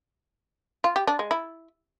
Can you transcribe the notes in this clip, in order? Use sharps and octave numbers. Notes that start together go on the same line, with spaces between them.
F4
G4
D4
G#3
E4